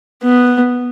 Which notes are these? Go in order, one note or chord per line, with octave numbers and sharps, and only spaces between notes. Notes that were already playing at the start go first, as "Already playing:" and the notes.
B3